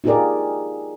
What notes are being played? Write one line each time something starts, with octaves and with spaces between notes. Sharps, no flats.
D#4 F4 G4 G#4 A#4 D5